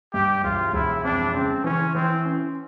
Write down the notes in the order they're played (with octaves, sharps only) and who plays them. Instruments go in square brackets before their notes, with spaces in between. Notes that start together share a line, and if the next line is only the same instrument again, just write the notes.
[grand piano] G2 [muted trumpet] G4
[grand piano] E1 [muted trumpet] F4
[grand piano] E1 [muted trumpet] E4
[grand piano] F2 [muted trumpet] D4
[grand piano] C#3 [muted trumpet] C4
[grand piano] E3 [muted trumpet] C#4
[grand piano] E3 [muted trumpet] C4
[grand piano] C#4